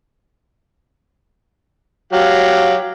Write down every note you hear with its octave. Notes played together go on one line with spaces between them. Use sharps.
F#3 G4 F5